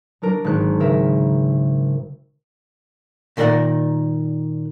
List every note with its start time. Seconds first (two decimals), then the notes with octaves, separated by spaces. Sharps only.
0.22 F#3 D4 A#4
0.44 G#1 F#6
0.80 C#3 A#4 E5
3.37 A#2 D#3 A4 A#4 D5 F#5